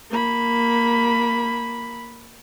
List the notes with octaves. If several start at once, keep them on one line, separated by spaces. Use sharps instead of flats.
A#3 B5